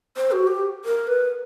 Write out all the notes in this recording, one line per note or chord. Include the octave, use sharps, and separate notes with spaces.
C5
F#4
G4
A#4
B4